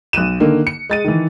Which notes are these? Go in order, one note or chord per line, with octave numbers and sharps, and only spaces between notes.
B1 F#6 D#7 E7
D3 D#3 A#3
C#7
G#3 A6 D#7
D#3 E3